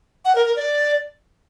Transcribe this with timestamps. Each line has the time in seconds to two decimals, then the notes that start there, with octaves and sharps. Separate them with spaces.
0.25 F#5
0.35 A#4
0.46 A#4
0.56 D5